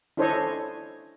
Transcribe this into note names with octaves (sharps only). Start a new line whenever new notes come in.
D4 E4 A4 C5 C#5 D#5